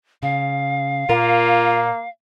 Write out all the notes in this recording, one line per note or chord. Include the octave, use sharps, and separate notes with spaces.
C#3 F5
A#2 A#3 F4 A#4